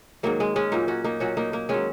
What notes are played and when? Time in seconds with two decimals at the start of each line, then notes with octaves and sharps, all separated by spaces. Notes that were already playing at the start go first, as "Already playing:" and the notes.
0.23 G#2 D#3 F#3 A#3
0.40 G#3
0.56 G#3 C#4
0.72 A#2 F#3 A#3 D#4
0.88 C#4 F#4
1.04 A#3 D#4
1.20 A#2 F#3 C#4 F#4
1.37 A#3 D#4
1.53 A#3
1.69 D#3 F#3 G#3 C#4